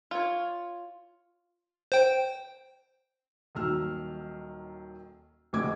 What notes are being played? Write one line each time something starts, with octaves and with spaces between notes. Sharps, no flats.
F4 C#5
C5 G5
D#1 D#3 F#3 E6 F6
F1 C#2 D3 D6 G#6